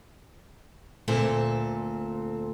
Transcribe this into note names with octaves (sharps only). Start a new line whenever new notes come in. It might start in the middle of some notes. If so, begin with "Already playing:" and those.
D2 A#2 C4 A4